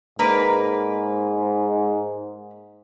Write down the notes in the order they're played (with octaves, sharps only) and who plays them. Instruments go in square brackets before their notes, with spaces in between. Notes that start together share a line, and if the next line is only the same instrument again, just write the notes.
[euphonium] G#2 [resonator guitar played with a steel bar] A#3 B4 D5